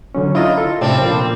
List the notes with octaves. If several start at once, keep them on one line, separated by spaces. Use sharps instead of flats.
D3 F#3 C#4
E4 F4 D#5 A#5
A4
A2 C3 G3 A3 C4 D4
A#2 F3 A#3